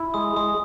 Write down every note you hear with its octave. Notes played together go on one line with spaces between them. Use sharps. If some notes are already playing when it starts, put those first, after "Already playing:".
Already playing: E4
G#3 D#6
G#3 D#6